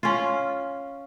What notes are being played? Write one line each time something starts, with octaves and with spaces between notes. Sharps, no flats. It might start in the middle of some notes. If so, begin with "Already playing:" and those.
C#4 F4